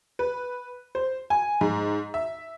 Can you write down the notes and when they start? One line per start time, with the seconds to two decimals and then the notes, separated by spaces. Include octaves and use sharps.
0.19 B4
0.95 C5
1.30 G#5
1.61 G#2
2.14 E5